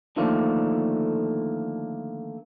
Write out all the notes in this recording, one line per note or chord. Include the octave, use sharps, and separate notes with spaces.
D3 D#3 F3 A3 A#3 D4